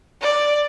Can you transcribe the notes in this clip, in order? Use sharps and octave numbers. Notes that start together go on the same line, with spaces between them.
D5